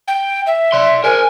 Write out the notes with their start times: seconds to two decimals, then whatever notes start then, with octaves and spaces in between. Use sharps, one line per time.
0.08 G5
0.47 E5
0.72 D5 C6
1.04 A#4 C5 G#5